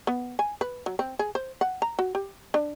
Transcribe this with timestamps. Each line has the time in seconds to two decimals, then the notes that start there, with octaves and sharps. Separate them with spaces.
0.07 B3
0.39 G#5
0.61 B4
0.86 F#3
0.99 C4
1.19 G#4
1.35 C5
1.61 F#5
1.82 A#5
1.99 F#4
2.15 G4
2.54 D4